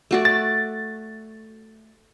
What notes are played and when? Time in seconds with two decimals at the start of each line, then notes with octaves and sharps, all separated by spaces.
0.11 A3 F#4 D5
0.25 A6